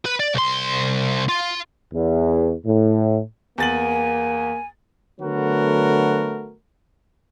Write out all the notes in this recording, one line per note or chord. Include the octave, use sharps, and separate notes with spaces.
B4
D5
C2 C6
F4
E2
A2
E2 A#3 G#5 A6 F#7
D3 F#3 A3 B3 F#4 A#4